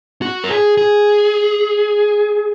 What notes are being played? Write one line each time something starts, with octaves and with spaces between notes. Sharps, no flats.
F#4
A#4
G#4
G#4